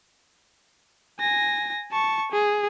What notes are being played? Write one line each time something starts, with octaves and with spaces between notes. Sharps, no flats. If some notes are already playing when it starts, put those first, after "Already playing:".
G#5 A#6
A5 C#6
G#4